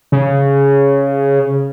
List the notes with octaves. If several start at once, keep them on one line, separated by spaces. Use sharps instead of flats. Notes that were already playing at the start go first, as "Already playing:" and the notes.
C#3